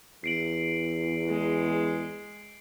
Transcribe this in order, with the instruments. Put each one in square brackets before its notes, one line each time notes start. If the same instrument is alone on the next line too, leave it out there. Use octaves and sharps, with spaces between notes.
[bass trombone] E2 [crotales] C7 D7 F#7
[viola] G#3